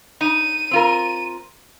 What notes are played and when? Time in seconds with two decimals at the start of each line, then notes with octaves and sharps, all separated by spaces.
0.21 D#4 D#7
0.71 C4 F4 A#4